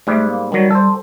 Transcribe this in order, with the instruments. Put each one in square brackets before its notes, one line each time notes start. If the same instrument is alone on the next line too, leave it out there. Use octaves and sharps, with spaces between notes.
[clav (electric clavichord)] G#2 G3 [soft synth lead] A3
[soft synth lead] A#3
[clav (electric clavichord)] D#3 F#3 [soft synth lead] G3
[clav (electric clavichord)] A4 C5